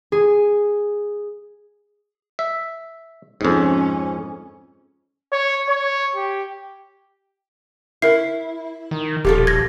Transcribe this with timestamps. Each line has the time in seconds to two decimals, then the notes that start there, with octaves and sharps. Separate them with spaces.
0.12 G#4
2.39 E5
3.41 F2 G#2 C#4
5.32 C#5
5.69 C#5
6.16 G4
8.02 E4 A#4 C7
8.91 D#3
9.25 D#1 B2 F3 G4 A4
9.47 G#6 A#6